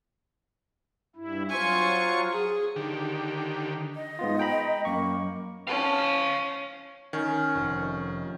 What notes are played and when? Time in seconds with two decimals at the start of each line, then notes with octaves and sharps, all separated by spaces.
1.16 G2 E4
1.49 F#3 F4 C5 G#5 C#6
2.32 G#4
2.76 D3 D#3 G4
3.95 D#5
4.19 G#2 B3 F4
4.39 G5 A#5 B5
4.85 F#2 A#3 C#6
5.67 C#4 F5 A5
7.13 D#3 C#4
7.56 F1